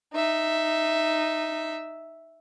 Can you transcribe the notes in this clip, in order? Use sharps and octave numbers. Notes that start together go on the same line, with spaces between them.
D#4 E5